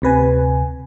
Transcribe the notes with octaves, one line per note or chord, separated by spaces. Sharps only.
D2 C3 B4 G#5